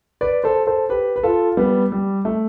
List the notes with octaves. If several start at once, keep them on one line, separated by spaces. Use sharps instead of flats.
B4 D5
A4 C5
A4 C5
G4 B4
B4
F4 A4
G3 B3
G3
A3